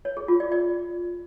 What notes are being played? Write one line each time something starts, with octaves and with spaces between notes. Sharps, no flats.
C#5
G#4
F4
D5
D5